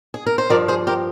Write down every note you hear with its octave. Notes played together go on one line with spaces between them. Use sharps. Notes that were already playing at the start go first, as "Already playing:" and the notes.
G#4
A#4
C5
G2 F3 A#4 D5
G#4 C5
G4 A#4